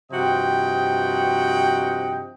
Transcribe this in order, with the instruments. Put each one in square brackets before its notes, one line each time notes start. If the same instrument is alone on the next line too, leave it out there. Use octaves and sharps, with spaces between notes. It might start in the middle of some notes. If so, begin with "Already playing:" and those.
[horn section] G2 C3 F3 F#4 D#5 G5